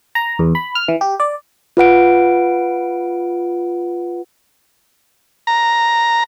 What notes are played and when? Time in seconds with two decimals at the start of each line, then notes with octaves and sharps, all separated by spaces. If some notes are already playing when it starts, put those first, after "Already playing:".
0.15 A#5
0.39 E2
0.55 B5
0.75 F6
0.88 E3
1.01 G4
1.20 D5
1.77 F4 B4 F#5 D7
5.47 A#5